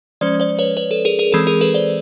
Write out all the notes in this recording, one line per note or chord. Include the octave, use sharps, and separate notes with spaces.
F3 G#3 C#4 C5 D5
C5 D5
B4 C#5
B4 C#5
A4
G#4 A#4
G#4 A#4
E3 G#3 C4 A4
G#4 A#4
A4 B4
C5 D5